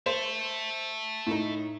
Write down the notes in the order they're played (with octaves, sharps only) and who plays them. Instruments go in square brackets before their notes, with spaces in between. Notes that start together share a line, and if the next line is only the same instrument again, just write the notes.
[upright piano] C5 [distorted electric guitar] E5 A5
[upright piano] A2 D#4